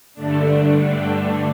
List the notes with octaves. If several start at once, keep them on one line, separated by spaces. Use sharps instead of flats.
G2 D3 A3 D4
G5